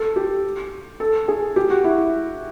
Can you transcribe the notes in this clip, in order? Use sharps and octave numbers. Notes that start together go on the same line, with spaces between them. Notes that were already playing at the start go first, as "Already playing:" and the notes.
Already playing: A4
G4
A4
G#4
G4
F#4
E4